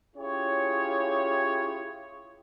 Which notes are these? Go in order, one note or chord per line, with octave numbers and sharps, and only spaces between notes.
C#4 E4 F4 G4 G#4 C#5